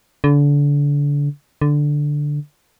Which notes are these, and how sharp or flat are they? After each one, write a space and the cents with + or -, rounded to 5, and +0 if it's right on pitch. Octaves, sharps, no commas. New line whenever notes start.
D3 -30
D3 +0